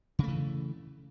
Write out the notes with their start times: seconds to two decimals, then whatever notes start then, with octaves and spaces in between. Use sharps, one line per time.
0.19 C#3
0.23 A3
0.28 E3